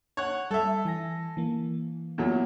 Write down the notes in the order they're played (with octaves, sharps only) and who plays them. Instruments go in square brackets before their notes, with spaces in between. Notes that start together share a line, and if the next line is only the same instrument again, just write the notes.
[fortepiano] C#5 F#5
[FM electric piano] G3 [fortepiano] A4 E5
[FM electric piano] E3 G#5 A#6
E3 A#3
[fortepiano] E2 A#2 F#3